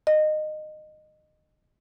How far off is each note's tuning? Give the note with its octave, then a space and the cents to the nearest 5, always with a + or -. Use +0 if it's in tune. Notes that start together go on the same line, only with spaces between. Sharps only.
D#5 -20